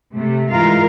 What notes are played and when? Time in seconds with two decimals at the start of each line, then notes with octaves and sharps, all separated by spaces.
0.14 C3 A3
0.50 G#2 E3 G#3 F4 A#4 F5